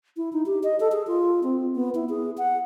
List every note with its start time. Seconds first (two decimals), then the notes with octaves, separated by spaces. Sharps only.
0.17 E4
0.33 D#4
0.46 G4
0.63 D#5
0.80 A4
0.92 G#4
1.07 F4
1.43 C4
1.75 B3
1.95 E4
2.10 G#4
2.38 F#5